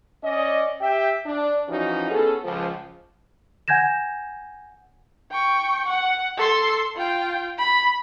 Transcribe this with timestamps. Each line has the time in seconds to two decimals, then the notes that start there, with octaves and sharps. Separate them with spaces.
0.23 C#4 D5 D#5
0.81 G4 E5 G5
1.24 D4
1.68 E3 F3 C#4 D#4 F#4
2.10 B3 C#4 G#4 A4
2.43 C#2 F3
3.68 F#5 G#5 G6 G#6 A#6 E7
5.32 G5 C#6
5.88 F#5
6.37 A4 C6
6.96 F4 G5
7.58 B5